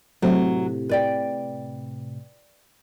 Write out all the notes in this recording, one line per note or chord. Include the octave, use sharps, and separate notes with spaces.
A2 C3 F#3
B4 D5 G5